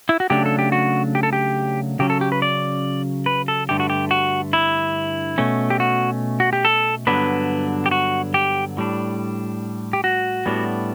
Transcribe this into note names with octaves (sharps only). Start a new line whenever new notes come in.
E4
F#4
C#3 F#3 A3 D4 G4
A4
G4
F#4
G4
A4
G4
C#3 F#3 C#4 G4
A4
G4
B4
D5
B4
A4
G2 D3 A3 G4
F#4
G4
F#4
E4
B2 A3 C#4
G4
F#4
F#4
G4
A4
G2 D3 F#3 B3 D4 B4
G4
F#4
G4
A2 G3 D4
G4
F#4
A2 G3 B3 D4